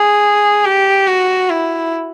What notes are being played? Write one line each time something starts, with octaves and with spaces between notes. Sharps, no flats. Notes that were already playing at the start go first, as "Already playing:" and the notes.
Already playing: G#4
G4
F#4
E4